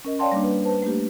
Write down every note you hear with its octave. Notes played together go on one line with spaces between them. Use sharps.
C#4 A#4 D#5
C#5 D5 F5 G5 A5 C6
G3 A#3 D4
B4
B4 C5 A5
A3 A#3 D4 G4